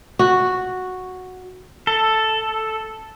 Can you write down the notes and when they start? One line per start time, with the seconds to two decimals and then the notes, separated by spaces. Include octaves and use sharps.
0.19 F#4
1.87 A4